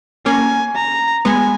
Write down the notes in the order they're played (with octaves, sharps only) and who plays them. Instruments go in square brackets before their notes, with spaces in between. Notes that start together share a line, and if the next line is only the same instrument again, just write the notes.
[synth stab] A#3 C#4 [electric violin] G#5
[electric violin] A#5
[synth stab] G#3 B3 [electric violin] G#5